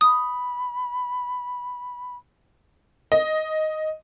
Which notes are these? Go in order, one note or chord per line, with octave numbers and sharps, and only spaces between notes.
B5 D#6
D#5